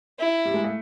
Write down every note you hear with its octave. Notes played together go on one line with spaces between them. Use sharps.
E4
G3
G#3
A3